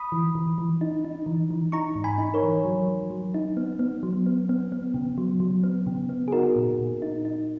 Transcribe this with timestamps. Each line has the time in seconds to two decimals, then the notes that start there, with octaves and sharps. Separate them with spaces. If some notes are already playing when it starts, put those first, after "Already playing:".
Already playing: B5 D#6
0.12 E3
0.35 E3
0.58 E3
0.81 D#4
1.05 D#4
1.26 E3
1.51 E3
1.72 D#4 A#5 C#6
1.95 G#2
2.04 G#5 B5
2.18 D#4
2.34 A#4 C#5
2.42 E3
2.65 F#3
2.88 F#3
3.11 F#3
3.34 D#4
3.57 B3
3.79 B3
4.03 F#3
4.26 B3
4.49 B3
4.72 B3
4.94 C#3
5.18 F#3
5.40 F#3
5.64 B3
5.87 C#3
6.09 B3
6.28 G#4
6.32 D#4 F#4 A#4
6.56 A#2
6.79 A#2
7.02 D#4
7.25 D#4